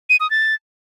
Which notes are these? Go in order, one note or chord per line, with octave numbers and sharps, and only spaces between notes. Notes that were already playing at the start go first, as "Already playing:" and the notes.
D#7
D#6
A6